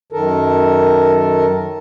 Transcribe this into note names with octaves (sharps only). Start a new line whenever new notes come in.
F#2 D#3 A4 A#4